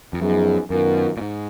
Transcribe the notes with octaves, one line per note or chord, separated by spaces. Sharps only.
F2
F#2 F3 B3 D#4 G#4
F#2 D#3 F#3 B3 F4 A#4
A#2
G#2